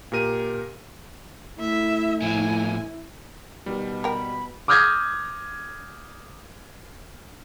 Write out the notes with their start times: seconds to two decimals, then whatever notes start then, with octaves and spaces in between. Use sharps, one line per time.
0.12 A#2 G4 A#4 D#7
1.60 A3 E4 E5
2.22 A2 F3 G#5
3.66 B2 D#3 G3
4.04 A#4 G5 B5
4.68 D6 D#6 F6 G6 G#6 A#6